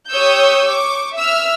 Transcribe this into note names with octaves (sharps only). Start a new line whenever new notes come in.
G4 C#5 C#6 D#6 E6 G6
C#6 D6
E5 E6 F6